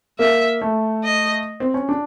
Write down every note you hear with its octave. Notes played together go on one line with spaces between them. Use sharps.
A#3 E5
A3
D#5
C4
C#4
D4